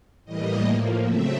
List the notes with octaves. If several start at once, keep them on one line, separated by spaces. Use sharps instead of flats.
A2 E3 G3 A#3 D#5
A2 F3 A#3
C#3 F#3 A3 C4 E5